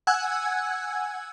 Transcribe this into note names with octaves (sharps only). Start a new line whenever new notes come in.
F#5 G#5 E6 F#6 G#6